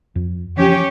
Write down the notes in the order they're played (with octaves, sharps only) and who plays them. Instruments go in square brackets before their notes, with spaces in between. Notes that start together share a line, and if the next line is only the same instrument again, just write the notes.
[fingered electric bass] F2
[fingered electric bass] C#3 E3 F3 [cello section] C#4 G4 C#5